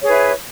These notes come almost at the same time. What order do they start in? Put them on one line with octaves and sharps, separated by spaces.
C#5 G#4 B4 E4